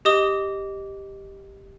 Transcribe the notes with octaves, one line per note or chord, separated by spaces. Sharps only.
G4 D#5 D#6 G7